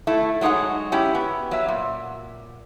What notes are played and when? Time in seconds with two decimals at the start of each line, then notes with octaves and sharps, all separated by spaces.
0.07 A3 E4
0.41 F#3 G#3 D#4 C#5 F#5
0.92 C#4 E4 G4
1.15 B3
1.51 F#3 E5
1.68 A#2